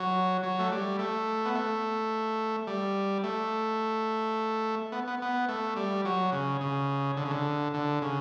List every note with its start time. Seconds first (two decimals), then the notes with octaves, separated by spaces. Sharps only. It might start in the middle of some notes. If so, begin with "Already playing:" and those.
Already playing: F#3
0.43 F#3
0.59 A3
0.71 G3
0.99 A3
1.46 B3
1.55 A3
2.67 G3
3.24 A3
4.92 B3
5.08 B3
5.22 B3
5.49 A3
5.76 G3
6.05 F#3
6.32 C#3
6.61 C#3
7.17 D3
7.25 C#3
7.31 D3
7.74 D3
8.02 C#3